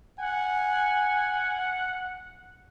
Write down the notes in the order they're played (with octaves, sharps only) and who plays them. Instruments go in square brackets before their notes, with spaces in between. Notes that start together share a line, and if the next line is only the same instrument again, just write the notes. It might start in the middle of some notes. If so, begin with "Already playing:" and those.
[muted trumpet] F#5 [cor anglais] G#5